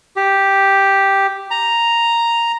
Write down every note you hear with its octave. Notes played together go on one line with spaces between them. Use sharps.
G4
A#5